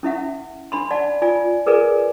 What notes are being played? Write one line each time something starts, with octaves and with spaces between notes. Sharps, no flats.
C#4 E4 E5 F#5
D4 B5 C6
D5 F#5 A5
F4 D5 G#5
G#4 A#4 B4 D5 G#5